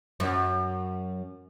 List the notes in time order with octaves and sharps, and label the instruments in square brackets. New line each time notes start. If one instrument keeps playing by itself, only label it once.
[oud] F#2